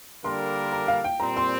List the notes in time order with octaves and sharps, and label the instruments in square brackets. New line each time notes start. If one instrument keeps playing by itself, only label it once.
[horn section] D3 G3 A#3 D4 A#4 [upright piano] C6
[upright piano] A#5
F5
G5
[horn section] A#2 G3 C4 [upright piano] A#5
[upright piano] C6